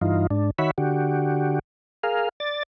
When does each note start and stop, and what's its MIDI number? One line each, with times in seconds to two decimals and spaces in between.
0.01 0.27 43
0.01 0.27 52
0.01 0.27 63
0.01 0.27 65
0.30 0.51 44
0.30 0.51 62
0.58 0.71 51
0.58 0.71 66
0.58 0.71 73
0.58 0.71 76
0.58 0.71 83
0.78 1.59 50
0.78 1.59 66
0.78 1.59 67
2.03 2.29 68
2.03 2.29 70
2.03 2.29 77
2.40 2.63 74
2.40 2.63 93